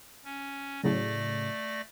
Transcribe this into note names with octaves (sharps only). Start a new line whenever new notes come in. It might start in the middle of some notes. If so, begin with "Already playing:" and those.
C#4
A2 C#3 F#3 A3 D5 A#6